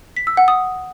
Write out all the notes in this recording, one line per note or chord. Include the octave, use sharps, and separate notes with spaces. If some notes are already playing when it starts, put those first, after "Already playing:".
B6
E6
F#5
D#6